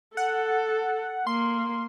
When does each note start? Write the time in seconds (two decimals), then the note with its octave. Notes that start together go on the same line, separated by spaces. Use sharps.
0.17 A4 F#5
1.27 A#3 C6